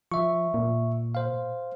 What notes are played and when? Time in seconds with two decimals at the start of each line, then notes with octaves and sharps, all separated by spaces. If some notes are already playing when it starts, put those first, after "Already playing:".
0.12 F3 E5 C#6
0.54 A#2
1.15 C5 F5